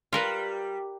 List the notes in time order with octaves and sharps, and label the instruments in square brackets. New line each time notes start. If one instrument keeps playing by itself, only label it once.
[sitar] G3 [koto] F4 A#4 B4